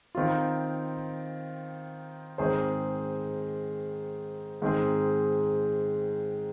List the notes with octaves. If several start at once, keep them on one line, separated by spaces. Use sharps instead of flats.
D#3 C4 F4
G#2 D#3 C4 G#4 C5
G#2 D#3 C4 G#4